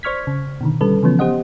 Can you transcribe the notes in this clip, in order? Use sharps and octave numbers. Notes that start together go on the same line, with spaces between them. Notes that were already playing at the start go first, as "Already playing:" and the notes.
C5 D5 C#6 F6 G#6 B6
C#3
B2 D3 D#3
D3 G3 C#4 A4 B4
C#3 E3 F3 B3 C#4
B3 G4 C5 D#5 F#5